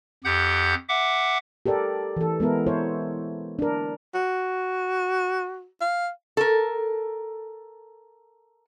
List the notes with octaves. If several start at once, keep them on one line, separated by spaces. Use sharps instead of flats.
F2 G4 F#5 G6
E5 F#5 D6
G4 A4 A#4 D5
E3 A4
G#3 B3 E4 A#4
E4 C5 C#5
D4 A#4
F#4
F5
A4 A#4